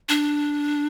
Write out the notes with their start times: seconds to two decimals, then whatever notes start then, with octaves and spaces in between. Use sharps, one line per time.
0.09 D4